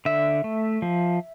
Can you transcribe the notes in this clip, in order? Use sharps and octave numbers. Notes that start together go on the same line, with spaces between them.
D3 E5
A3
F3